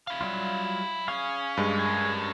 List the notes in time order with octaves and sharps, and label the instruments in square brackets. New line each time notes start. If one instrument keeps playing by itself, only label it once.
[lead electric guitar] E4 F5
[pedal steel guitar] F#3 G3 F4
[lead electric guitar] C#4 [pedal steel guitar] G#4 F5
[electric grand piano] G2 G#3
[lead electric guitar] C#4 A#4 [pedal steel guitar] G#4